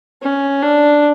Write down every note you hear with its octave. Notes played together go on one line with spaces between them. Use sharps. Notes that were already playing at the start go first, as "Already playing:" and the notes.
C#4
D4